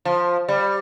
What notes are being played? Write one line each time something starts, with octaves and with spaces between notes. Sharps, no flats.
F3
G3